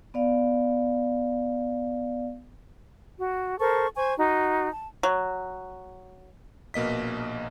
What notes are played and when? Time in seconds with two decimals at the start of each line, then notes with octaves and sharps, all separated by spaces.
0.14 B3 D5 F5
3.18 F#4
3.59 A4 A#4 C5 C#6
3.95 C5 G#5 C#6
4.18 D#4 F#4
4.70 A5
5.03 F#3
6.74 A#1 B2 A#3 D#5 B6